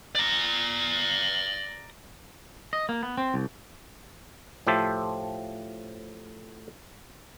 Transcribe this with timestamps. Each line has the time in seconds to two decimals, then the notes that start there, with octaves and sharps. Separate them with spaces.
0.15 D5 A#5
2.73 D#5
2.89 A#3
3.03 B3
3.18 C4
3.34 C2
4.67 A2 F3 G4 C5 E5 A5